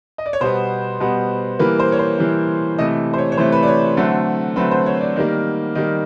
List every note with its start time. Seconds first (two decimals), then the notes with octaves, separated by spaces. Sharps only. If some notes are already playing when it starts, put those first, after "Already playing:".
0.18 D#5
0.26 D5
0.33 C#5
0.40 B2 G3 B3 C5
1.00 B2 G3 B3
1.59 E3 G3 A#3 B4
1.80 C5
1.92 C#5
1.99 C5
2.19 E3 G3 A#3
2.78 C3 E3 A3 D#5
3.13 C5
3.18 C#5
3.32 C#5
3.37 C3 E3 A3 C5
3.52 B4
3.63 D5
3.68 C#5
3.97 D3 F#3 A3 C4
4.56 D3 F#3 A3 C4 B4
4.71 C5
4.86 C#5
5.01 D5
5.16 D#3 G3 A#3
5.75 D#3 G3 A#3